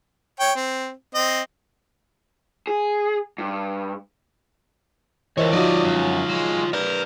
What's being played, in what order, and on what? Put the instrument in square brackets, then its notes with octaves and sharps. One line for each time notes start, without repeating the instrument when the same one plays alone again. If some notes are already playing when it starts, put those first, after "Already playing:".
[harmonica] C#5 G5
C4
C4 D#5
[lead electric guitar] G#4
G2
[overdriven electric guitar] E3 [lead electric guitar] F4 C#5 [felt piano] A#4 C5 D#5
[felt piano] F3 D#4 F#4 [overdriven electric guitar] D5 D#5
[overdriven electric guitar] F#2
F#3 G#3
[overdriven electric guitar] A#4 [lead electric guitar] B4 D5